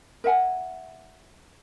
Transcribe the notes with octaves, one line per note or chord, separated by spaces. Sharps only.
A#4 E5 F#5 G#5